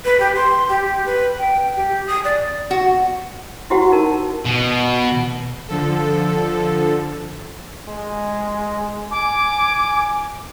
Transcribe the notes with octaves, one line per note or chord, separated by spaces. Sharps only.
B4
G4
C6
G4
B4
G5
G4
D#6
D5
F#4
E4 F#4 G4 C5 F#5
D#4 A#4 A5
B2
D3 F3 A4
G#3
G#5 D6